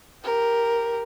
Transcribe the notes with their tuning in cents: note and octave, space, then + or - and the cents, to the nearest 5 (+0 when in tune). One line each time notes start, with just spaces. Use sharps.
G4 +0 A#4 +0